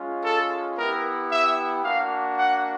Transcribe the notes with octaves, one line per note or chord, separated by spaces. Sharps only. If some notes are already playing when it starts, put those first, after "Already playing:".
Already playing: G#3 C#4 F4
A4
B3 E4 G4 A#4
E5
A#3 D4 F#4 F5
F#5